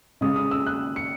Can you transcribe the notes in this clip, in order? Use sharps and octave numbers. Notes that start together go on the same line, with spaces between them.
C#3 G#3 D#6
D#6
E6
F#6
C#7